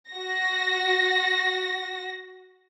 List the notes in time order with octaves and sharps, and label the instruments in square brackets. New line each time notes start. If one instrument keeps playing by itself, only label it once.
[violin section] F#4 A#6